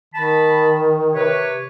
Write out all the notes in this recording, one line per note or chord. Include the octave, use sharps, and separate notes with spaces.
D#3 A5 B5
C3 B4 C#5